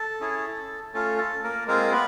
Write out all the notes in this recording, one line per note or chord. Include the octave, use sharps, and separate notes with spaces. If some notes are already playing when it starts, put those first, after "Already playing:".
Already playing: A4
C#4 E4 G#4
A3 C#4 F4 A4
A4
A#3 A#4
G#3 A#3 C4 F4 A#4
B3 B4